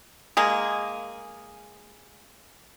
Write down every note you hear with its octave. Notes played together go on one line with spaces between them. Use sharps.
G#3 A#3 G#4